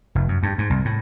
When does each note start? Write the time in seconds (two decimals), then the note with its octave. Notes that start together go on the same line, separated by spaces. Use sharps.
0.15 F1
0.28 F#2
0.43 G2
0.58 G#2
0.70 C2
0.85 A2